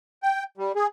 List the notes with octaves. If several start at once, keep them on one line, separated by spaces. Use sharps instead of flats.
G5
G3
G#4